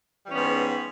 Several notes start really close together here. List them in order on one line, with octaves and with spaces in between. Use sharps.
G3 E3 C#4 B3 G#2